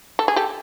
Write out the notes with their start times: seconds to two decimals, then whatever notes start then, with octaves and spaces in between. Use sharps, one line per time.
0.19 A4
0.28 G#4
0.36 G4 A4